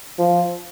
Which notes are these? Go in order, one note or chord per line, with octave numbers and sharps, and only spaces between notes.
F3